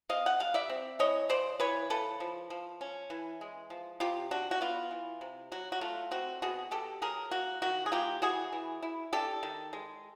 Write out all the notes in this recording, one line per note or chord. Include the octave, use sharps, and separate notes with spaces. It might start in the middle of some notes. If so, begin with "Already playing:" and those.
C4 D#5 F5
F#5
G3 F5
D5 E5
C4
E3 C#5 D#5
C#3 C5 D5
E3 B4 C#5
C#3 A4 B4
F3
F3
C#4
E3
G#3
F3
C3 F4 G4
D4 F#4
F#4
B3 F4
E3
C3
F#3 F#4
F#4
A3 F4
C4 F#4
B2 F#4 G#4
B2 G4 A4
F#3 G#4 A#4
A#3 F#4
D#3 F#4
G#4
A#3 F4 G4
E3 F#4 G#4
E3
E4
D4 G4 A4
D#3
G#3